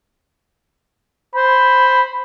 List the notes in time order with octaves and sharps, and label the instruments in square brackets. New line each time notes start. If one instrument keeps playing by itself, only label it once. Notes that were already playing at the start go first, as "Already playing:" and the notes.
[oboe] C5 [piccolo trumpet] B5